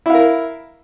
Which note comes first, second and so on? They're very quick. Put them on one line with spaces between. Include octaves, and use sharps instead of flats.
E4 F5 A#4